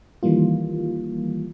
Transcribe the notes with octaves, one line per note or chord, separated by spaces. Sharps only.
D#3 E3 G3 A#3 F4